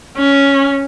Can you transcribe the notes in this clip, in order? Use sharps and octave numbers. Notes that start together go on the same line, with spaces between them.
C#4